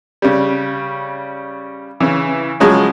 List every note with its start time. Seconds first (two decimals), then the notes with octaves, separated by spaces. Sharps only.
0.22 C#3 G3
2.00 C#3 E3
2.60 C#3 F3 F#3 G#3